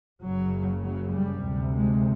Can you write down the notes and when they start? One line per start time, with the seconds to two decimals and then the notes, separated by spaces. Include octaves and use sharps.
0.23 F#1 F#2 C#3 F#3
0.84 F#3
1.14 G3
1.45 D2 C3
1.76 G#3